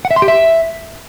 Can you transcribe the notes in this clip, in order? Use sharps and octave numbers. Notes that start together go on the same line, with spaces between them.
F#5
E5
C6
G4
E5